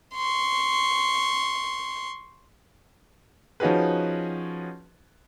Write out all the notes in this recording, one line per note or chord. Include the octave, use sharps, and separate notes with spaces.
C6 C#6
F3 C#4 D#4 F#4 G#4 B4